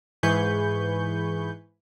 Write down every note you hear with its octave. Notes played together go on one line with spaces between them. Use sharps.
G#2 E3 G#4 B4 C#6 G6